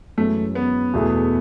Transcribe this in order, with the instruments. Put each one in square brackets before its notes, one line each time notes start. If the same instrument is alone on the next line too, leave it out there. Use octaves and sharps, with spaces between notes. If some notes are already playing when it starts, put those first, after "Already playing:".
[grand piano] F#2 E3 G#3 C#4 [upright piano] A3
[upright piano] B3
[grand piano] E2 B2 A3 E4 G#4